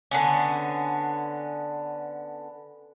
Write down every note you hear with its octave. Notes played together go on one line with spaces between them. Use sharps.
D3 B3 C#4